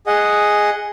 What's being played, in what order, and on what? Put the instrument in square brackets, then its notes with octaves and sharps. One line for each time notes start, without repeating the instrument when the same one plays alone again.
[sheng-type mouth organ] G#4 D#5 F#5